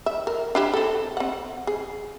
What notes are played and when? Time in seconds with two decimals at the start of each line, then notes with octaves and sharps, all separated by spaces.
0.06 E5
0.27 A#4
0.55 D4 E4 G4
0.74 C4 A4
1.17 C4 F#5
1.67 G#4